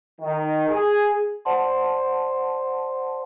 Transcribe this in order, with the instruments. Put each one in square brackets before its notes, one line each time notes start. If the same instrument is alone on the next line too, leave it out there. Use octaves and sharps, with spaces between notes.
[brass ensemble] D#3
G#4
[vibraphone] C5 D5 F#5 A5 C6